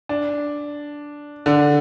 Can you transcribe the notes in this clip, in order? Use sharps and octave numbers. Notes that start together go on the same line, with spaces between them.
D4
D3